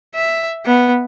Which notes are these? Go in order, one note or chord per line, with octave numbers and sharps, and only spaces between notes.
E5
B3